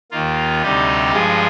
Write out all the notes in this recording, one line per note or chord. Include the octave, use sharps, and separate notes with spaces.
D#2 D#3 A#3 F4
D2 C3 G3 D#4 G4
G2 F3 G#3 F4 G#4